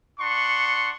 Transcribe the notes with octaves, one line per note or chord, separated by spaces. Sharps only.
D4 F#5 C6 C#6